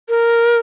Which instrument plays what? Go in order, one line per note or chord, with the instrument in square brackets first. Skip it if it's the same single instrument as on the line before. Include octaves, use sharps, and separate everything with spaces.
[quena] A#4